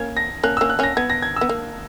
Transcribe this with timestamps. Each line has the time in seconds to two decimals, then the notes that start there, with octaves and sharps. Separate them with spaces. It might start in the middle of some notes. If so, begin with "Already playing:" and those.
Already playing: A#3 C#4 G#6
0.17 A#6
0.43 A#3 C#4 F#6
0.57 A#3 C#4 E6
0.70 F#6
0.79 A#3 C#4 A#6
0.97 B3 G#6
1.10 A#6
1.22 G#6
1.36 B3 E6
1.49 A#3